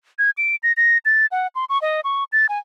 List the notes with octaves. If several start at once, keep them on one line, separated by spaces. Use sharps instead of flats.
G#6
D7
A#6
A#6
A6
F#5
C6
C#6
D#5
C#6
A6
G#5